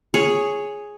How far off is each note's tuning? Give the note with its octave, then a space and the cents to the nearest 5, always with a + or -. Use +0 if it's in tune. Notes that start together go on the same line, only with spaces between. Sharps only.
G#4 +0 C#5 +0